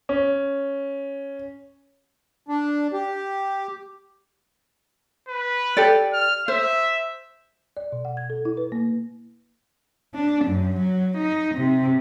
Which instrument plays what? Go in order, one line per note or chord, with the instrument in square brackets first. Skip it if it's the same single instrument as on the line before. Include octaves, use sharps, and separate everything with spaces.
[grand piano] C#4
[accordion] D4
G4
[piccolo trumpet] B4
[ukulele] G4 A4 D5
[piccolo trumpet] F6
[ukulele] C5 [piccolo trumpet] E5
[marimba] D5
B2
F#5
G#6
A4
E4
B4
A#3
[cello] D4
F#2
F#3
D#4
C3